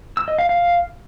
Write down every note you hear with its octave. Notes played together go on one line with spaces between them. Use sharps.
E6
D#5
F5
F5